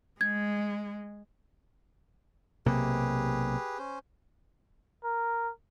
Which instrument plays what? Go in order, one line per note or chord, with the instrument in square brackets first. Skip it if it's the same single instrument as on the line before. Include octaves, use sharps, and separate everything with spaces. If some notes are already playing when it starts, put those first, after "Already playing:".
[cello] G#3 [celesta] G#6
[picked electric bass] B1 C3 A#3 [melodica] G4 G#4 B4
[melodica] C#4 C5
[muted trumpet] A#4